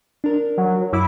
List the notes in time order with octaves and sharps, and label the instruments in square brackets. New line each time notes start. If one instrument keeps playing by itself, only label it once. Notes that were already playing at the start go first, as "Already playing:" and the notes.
[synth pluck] D4 A#4
[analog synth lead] F#3
[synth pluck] F#2 D6 [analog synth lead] E4